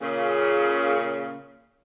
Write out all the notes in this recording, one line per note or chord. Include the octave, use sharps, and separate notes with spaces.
A#2 C#3